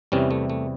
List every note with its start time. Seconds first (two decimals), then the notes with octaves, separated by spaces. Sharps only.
0.12 E2 C3 E3 G3 C#4
0.31 A3
0.50 A3